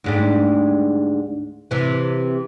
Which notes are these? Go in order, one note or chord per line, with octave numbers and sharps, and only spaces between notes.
D2 G#2 G3
C3 E3